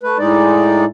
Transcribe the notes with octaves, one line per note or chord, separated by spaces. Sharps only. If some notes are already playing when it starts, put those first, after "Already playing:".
A3 B4
A2 G#3 D#4 D5